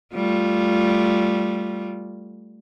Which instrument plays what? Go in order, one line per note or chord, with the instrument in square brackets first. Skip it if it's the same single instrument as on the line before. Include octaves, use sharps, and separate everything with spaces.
[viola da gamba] G3 A3 F4